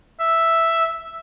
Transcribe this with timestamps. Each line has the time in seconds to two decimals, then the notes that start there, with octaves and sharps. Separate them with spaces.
0.20 E5